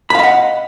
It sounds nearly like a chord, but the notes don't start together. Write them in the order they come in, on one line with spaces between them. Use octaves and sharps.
B5 F5 D#5 F#5